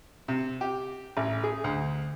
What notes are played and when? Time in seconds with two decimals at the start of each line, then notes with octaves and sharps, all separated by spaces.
0.28 C3
0.61 G4
1.17 A1
1.44 G#4
1.64 D2